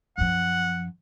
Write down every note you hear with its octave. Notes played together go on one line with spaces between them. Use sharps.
F#2 F3 F#5